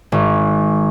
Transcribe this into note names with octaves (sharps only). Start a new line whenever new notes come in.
G#1